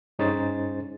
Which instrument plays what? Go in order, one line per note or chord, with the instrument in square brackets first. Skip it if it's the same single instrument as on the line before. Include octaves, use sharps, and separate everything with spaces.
[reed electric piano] G2 C#4 D#4 G#4 C5 A6